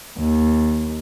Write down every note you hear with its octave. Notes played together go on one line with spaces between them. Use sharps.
D#2